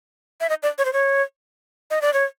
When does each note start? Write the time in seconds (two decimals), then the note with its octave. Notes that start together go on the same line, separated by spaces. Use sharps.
0.41 E5
0.49 D#5
0.63 D5
0.78 C#5
0.85 C5
0.93 C#5
1.91 D#5
2.02 D5
2.13 C#5